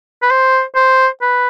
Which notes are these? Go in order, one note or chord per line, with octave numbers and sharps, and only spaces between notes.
B4
C5
C5
B4